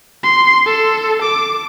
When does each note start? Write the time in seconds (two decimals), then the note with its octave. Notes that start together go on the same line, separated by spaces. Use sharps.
0.23 C6
0.66 A4
1.22 D6